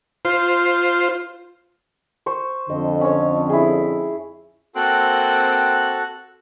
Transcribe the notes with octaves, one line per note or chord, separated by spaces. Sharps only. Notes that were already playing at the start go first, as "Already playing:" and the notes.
F4 C5
C5 C#6
F2 D3 D#5
C#4 C#5
E4 G#4
A#3 C4 F#4 A4 F#6